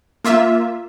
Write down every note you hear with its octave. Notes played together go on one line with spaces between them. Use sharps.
A#3 F4 E5